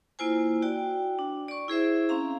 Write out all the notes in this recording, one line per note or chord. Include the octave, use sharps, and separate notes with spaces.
A#3 E4 F4 C5 G#5
F#4 D5 G5
D4
D5 C#6
E4 G#4 C5 E5
C4 C#4 F5 A#5